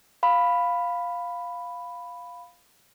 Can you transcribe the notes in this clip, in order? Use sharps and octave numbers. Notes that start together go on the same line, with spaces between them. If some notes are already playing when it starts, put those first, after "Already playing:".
F5 B5